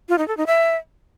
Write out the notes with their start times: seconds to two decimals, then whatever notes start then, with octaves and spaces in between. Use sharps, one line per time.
0.09 F4
0.18 D#4
0.28 A4
0.37 D#4
0.47 E5